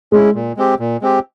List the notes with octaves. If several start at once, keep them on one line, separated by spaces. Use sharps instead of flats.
G#3 C#4 E4
A#2
G#3 C4 G4
A#2
G#3 C4 G4